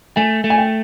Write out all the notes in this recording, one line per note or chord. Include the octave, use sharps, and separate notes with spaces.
A3 G#5
A3
G#5
G5